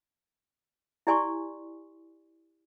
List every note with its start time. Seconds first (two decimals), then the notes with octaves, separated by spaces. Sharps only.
1.07 E4 G4 D5 G#5 C6 C#6